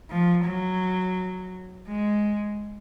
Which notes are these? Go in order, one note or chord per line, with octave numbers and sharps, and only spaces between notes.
F3
F#3
G#3